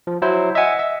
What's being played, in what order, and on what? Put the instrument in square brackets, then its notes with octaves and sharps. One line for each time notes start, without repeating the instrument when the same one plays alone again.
[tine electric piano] F3
F#3 E4 C5
[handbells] D#5 F#5 [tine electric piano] E5 G#5
[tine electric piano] E5